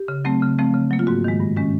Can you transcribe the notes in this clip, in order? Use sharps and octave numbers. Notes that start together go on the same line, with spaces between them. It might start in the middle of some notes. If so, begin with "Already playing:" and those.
Already playing: G4
C#3
F#3 A3 C4
C#3
F3 A3 C4
C#3
F#3 A#3
F4
G#2 F#4
D#3 G#3
G2
D#3 G#3 C#4